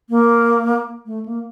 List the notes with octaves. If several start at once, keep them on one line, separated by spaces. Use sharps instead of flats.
A#3
A3
A#3